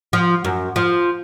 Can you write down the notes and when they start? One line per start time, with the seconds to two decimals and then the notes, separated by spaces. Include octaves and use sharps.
0.13 F3
0.45 F#2
0.76 F3